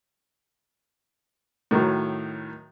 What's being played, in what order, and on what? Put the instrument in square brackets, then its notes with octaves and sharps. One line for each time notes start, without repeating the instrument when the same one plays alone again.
[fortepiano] A2 D#3 F#3